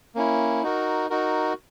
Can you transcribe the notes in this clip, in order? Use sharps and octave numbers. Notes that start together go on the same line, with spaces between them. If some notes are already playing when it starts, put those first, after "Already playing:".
A#3 C#4 E4
D#4 F#4 A#4
D#4 F#4 A#4